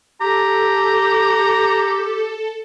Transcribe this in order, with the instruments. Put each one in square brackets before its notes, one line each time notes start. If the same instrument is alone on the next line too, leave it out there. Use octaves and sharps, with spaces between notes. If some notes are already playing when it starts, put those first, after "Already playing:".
[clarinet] G4 [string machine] A4 [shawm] A#5